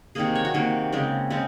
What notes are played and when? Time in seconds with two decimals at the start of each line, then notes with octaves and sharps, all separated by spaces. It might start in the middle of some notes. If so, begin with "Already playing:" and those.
0.15 C3 D#3 A#3 G#4
0.35 C#5
0.45 F#4
0.54 C3 D#3 A#3
0.92 C#3 G#3 C4
1.30 C#3 G#3 C4